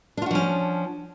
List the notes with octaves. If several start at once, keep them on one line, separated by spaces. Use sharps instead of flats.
F3 C#4 D4 F4 F#4